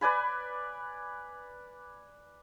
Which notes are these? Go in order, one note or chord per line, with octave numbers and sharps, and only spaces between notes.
B4 D5 G#5 B5